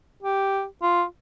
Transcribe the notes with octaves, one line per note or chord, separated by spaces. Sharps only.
G4
F4